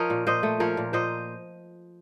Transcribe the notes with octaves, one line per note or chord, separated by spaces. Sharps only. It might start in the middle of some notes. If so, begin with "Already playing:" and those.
Already playing: F3 A#4 C#5 D#5
A#2
A#2 C5 D#5
A3
F3 A#4 C#5
A#2
A#2 C5 D#5